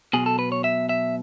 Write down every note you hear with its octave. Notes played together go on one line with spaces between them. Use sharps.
B1 B2 G#4
A4
B4
C#5
E5
E5